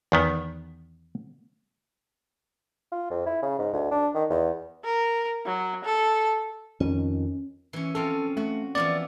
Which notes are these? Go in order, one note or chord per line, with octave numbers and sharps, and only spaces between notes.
E2 D#3 B3
F4
F2
E4
C#3
G#2
D2
D4
D#3
E2
A#4
F#3
A4
F2 D#3 C#4
E3 C#4
F3 C4 C#4 A4
A3 F#4
E3 F3 B3 D5